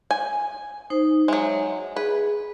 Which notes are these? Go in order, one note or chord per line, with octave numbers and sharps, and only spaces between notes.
G#5
D#4 C5
F#3 G#3 E5
G#4 B4